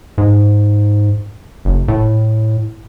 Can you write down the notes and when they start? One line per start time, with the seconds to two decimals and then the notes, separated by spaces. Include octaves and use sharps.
0.18 G#2
1.65 F#1
1.88 A2